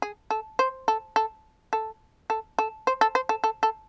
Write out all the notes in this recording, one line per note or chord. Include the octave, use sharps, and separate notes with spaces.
G#4
A4
C5
A4
A4
A4
A4
A4
C5
A4
C5
A4
A4
A4